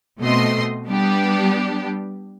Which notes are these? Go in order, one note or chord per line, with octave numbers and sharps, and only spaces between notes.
B2 A3 C4 D#5 C6
G3 B3 D4 G4